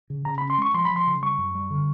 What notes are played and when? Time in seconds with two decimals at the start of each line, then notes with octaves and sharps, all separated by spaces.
0.10 C#3
0.25 C#3 A#5
0.38 C#4 B5
0.50 C6
0.58 G#3 C#6
0.74 F3 C6
0.85 B5
0.90 F3
0.96 C6
1.07 C#3
1.22 G3 C#6
1.38 F#2
1.55 G3
1.71 D3